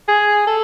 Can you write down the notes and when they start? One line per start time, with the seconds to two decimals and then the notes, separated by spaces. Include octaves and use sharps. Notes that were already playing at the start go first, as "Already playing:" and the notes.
0.08 G#4
0.47 A4